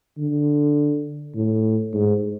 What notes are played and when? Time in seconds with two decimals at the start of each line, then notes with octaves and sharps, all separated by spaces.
0.18 D3
1.36 A2
1.94 G#2